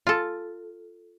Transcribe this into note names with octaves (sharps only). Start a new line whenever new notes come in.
F4 A4